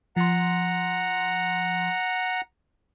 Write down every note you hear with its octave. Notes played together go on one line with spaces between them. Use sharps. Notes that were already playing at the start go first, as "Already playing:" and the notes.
F3 F#5 A#5 C6